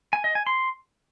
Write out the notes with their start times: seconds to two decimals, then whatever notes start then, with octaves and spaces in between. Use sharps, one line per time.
0.13 G#5
0.24 D#5
0.35 G#5
0.47 C6